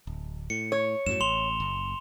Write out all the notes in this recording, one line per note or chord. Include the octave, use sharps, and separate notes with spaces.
D1
A2 C#7
C#5
F#2 A2 F#3 E7
A1 C6 F7 G7
F#1